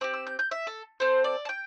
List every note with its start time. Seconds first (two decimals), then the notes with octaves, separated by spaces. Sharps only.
0.01 C4 G4 D6
0.14 E6
0.27 G6
0.39 G6
0.51 E5
0.67 A4
1.00 C4 A4 C5
1.24 D5
1.45 A5
1.49 G5